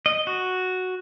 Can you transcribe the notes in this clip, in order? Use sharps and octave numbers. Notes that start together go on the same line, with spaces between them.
D#5
F#4